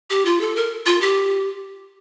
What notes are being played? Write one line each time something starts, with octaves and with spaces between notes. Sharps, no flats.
G4
F4
A4
A#4
F4
G4